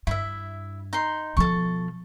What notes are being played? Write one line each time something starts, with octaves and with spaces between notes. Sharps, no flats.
G2 E4 E5
D#4 C6
B2 F3 A4 C#6